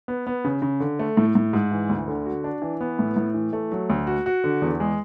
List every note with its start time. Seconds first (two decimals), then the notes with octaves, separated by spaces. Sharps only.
0.08 B3
0.27 B3
0.44 C#3
0.62 C#3
0.80 D3
0.99 A3
1.17 A2
1.35 A2
1.53 G#2
1.71 E3
1.89 D2
2.08 D3
2.26 F#4
2.44 D4
2.62 E3
2.81 B3
2.99 A2
3.16 A2
3.34 E3
3.53 A3
3.72 F#3
3.90 D2
4.07 F#4
4.26 F#4
4.44 D3
4.62 E2
4.80 G#3